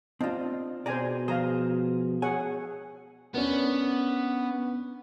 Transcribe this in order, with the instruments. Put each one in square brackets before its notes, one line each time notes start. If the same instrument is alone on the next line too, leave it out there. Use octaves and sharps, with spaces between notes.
[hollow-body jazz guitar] C4 F4 [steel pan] D4 D#5 A5
[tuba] B2 [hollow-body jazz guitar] G#4 D5 [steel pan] C5 G#5 A#5
[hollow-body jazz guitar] F3 G#4 C5 [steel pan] F5 A#5 D#6
[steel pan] G#4 C#5 F#5 [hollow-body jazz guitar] G#5
[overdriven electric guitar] B3 [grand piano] C#4 D4 A#4